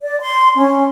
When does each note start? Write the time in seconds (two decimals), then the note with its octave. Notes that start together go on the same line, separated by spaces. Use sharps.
0.03 D5
0.20 C6
0.57 C#4